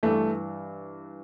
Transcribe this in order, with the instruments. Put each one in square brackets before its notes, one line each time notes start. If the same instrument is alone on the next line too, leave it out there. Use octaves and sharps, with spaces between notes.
[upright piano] G2 E3 A3